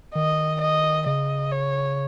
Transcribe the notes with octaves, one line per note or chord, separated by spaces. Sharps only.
D#3 D#5
D#5
C#3 D#5
C#5